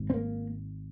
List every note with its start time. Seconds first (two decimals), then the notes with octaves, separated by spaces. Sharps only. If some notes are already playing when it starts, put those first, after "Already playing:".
Already playing: G#1 G#2
0.10 C4
0.14 A#3